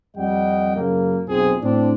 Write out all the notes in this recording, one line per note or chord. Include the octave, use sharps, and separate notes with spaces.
F2 G3 D#5 F#5 G5
F#2 C#3 A#3
B1 F2 F3 C4 G#4
A2 C4 D4